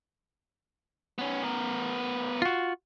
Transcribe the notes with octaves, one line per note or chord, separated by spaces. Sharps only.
B3 C#4
B3 A#4
F4 F#4